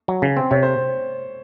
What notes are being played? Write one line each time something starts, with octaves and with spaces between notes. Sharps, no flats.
F#3
C#3
C4
C3 C#5
C5